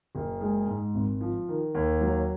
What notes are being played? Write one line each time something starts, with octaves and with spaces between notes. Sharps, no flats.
F#1
G#3
G#2
G#1
F3
D#3
D#2
F#3